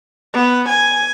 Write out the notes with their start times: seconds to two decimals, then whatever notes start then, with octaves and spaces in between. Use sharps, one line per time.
0.34 B3
0.69 G#5